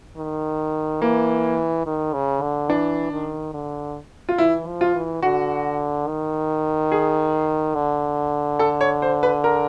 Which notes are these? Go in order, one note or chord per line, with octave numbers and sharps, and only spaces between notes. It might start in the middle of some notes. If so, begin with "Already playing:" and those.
D#3
E3 A#3
D#3
C#3
D3
E3 D4
D#3
D3
F4
E3 E4
F3
F4
E3
D3 F#4
D#3
G#4
D3
A4
C#5
C5
B4
A#4